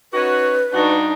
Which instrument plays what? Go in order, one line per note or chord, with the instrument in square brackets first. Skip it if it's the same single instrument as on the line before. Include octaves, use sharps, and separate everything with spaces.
[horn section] C#4 D#4 F#4 [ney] B4
[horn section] G2 F#4 [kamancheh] D4 D#4